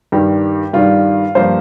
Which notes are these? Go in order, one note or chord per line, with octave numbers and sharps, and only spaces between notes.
G2 D#3 G3 G4
G2 D#3 G3 F4
G2 F3 A#3 C5